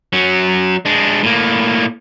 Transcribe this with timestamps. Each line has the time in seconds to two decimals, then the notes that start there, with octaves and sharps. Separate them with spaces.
0.13 F#3 C#4
0.85 G#3 D4
1.23 A2 A#3